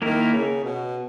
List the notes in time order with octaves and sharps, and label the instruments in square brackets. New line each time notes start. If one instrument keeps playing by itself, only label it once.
[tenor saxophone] D#3 [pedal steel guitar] A#3 E4 A#4
[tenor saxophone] C#3
B2